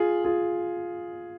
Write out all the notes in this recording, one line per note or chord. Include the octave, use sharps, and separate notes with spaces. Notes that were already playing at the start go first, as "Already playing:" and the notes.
Already playing: F4 G#4
F4 G#4